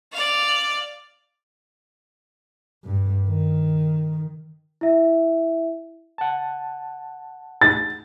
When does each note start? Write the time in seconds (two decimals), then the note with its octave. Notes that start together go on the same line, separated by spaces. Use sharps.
0.13 D5 F5
2.84 G2
3.27 D#3
4.81 E4 E5
6.18 F#5 A5
7.61 A6